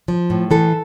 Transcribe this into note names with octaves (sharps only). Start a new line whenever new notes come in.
F3
A2
E3 A4